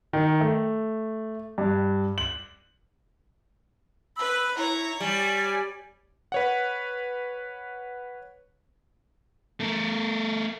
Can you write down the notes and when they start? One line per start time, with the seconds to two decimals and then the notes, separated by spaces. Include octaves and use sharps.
0.13 D#3
0.41 A3
1.58 G2
2.18 F#7
4.17 B4 B5 E6
4.57 E4 C#5 A#5
5.00 G3 D5 G#5
6.32 B4 C#5 F#5
9.60 A3 A#4